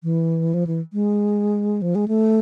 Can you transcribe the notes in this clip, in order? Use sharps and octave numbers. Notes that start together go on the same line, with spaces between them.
E3
F3
E3
G#3
F3
G#3
A3